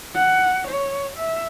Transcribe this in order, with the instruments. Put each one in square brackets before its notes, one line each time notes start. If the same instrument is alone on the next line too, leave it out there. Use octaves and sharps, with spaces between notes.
[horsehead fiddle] F#5
C#5
E5